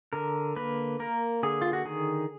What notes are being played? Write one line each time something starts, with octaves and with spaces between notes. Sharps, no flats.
D3 A#4
A#3 B4
A#3 A#4
D3 G#4
F4
F#4
D#3 G#4